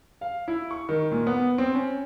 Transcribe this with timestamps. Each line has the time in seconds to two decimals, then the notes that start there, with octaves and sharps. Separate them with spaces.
0.21 F5
0.48 E4
0.71 C#6
0.89 D#3
1.11 A#2
1.27 B3
1.58 C4
1.75 C#4